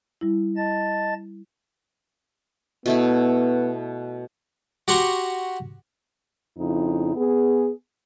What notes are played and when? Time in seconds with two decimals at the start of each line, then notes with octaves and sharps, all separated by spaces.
0.21 G3 E4
0.57 D#5 A5 A6
2.86 B2 A3 B3 E4
4.88 F#4 G4 F#5 A#5 C6 C#6
6.58 F2 C#3 D#4 E4
7.16 B3 G#4